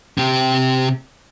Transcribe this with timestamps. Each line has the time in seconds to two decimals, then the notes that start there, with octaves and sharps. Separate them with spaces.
0.18 C3 G4